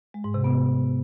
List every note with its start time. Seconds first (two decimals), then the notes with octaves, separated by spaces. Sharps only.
0.14 G#3
0.24 G#2
0.34 C3
0.44 B3